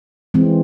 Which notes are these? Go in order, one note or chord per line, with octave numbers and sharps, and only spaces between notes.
E3 G#3 C4